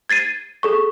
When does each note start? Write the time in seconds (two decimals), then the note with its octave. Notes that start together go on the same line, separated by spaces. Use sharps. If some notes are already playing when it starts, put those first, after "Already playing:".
0.10 G#6 A6 C7 D#7
0.63 G#4 A4 C#6